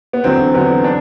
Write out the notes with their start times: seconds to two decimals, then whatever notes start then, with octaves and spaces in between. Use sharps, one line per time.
0.13 B3
0.24 E2 D3 F#3 C4
0.54 E2 D3 F#3 B3
0.84 D4